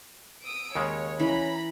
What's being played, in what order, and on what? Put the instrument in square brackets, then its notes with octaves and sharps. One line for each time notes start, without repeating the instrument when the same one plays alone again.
[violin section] D#6 E6 D7
[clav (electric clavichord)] D#2 C#3 G#3 [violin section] C#5
[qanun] E3 [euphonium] C#4 [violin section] A#5 B5